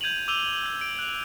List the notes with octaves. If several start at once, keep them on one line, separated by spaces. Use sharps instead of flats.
G6 G#6 D#7 F7 F#7
D6 E6 D#7 F7 G7
G6
D7
F#6 F7